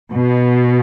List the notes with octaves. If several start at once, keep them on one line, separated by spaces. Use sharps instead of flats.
B2